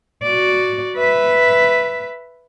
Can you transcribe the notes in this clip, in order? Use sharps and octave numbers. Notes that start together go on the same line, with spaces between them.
F#4 D5
B4 E5